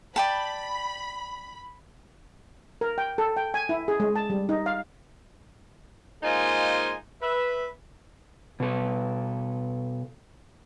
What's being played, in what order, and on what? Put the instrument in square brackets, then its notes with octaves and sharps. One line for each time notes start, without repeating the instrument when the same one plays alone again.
[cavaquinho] D5 G5 A5 [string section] B5
[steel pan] A#4
G5
A4
G5
G#5
E4
G#4
G#3
A5
G3
D#4
F5
[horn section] G#3 A#3 D#4 F4 C5 G#5
B4 E5
[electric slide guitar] B2 A4